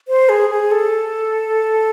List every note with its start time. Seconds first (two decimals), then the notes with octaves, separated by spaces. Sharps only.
0.08 C5
0.29 G#4
0.50 G#4
0.71 A4